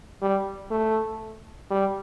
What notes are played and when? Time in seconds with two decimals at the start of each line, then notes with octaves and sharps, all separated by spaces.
0.21 G3
0.71 A3
1.70 G3